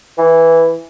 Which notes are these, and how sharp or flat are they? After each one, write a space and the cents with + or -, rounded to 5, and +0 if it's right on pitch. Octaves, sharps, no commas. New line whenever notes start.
E3 +0